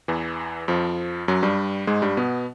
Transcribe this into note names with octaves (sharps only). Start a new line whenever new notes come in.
E2 E3
F2 F3
F#2 F#3
G2 G3
G#2 G#3
G2 G3
B2 B3